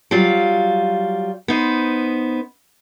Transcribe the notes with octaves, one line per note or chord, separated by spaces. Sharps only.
F#3 G3 F4
B3 D#4 C5